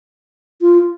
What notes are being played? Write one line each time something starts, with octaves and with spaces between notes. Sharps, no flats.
F4